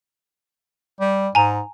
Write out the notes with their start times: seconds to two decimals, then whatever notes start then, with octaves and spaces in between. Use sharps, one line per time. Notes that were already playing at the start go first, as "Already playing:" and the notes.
1.01 G3
1.35 G#2 G#5 A#5